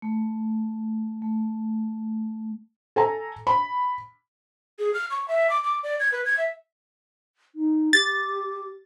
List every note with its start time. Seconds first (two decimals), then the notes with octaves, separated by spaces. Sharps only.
0.02 A3
1.22 A3
2.96 A4 G#5 A#5
3.47 B5
4.79 G#4
4.94 F6
5.10 C#6
5.28 E5
5.50 D6
5.64 D6
5.83 D5
6.00 G#6
6.12 B4
6.25 G#6
6.38 E5
7.55 D#4
7.93 G4 A6